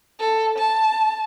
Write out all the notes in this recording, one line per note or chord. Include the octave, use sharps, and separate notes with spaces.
A4
A5